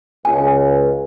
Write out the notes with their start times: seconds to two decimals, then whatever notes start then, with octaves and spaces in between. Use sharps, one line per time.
0.25 C#2 G#5